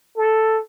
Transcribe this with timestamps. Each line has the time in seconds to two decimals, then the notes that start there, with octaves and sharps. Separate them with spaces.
0.17 A4